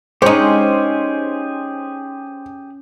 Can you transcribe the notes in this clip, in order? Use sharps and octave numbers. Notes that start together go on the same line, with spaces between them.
G#3 C#4 D#4 G4 G#4 C5